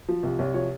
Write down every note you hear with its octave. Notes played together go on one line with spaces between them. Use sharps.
F3
C2
C2 C#5
F3 C#5